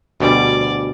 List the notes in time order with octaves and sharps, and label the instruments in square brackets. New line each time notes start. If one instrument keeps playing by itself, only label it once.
[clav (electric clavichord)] D2 B2 G3 [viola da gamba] D5